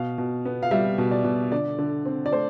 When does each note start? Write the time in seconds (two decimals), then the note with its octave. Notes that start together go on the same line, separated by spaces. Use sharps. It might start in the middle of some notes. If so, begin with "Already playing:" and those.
Already playing: B2 F5
0.18 B2
0.45 B3
0.63 F5
0.71 G3 E5
0.98 B2
1.11 D5
1.24 B2
1.52 D3 D5
1.79 D3
2.06 C4
2.26 D5
2.32 A3 C5